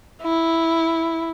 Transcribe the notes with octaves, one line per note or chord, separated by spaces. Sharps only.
E4